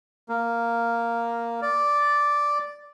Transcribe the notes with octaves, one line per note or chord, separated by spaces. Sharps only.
A#3
D5